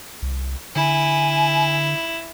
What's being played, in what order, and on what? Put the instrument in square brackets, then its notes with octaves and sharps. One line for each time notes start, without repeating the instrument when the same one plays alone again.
[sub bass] C2
[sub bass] D3 [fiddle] E4 [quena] G#5